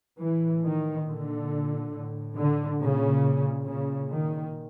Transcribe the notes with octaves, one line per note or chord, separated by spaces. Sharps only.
A2 E3
D#3
A#2 D3
A2
D3
A#2 C#3
A#2 C#3
D#3